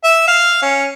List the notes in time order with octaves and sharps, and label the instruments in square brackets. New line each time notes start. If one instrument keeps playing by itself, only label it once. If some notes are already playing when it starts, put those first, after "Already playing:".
[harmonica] E5
F5
C#4